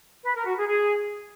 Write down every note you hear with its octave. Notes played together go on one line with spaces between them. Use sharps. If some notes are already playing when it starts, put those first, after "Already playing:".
B4
A#4
F#4
G#4
G#4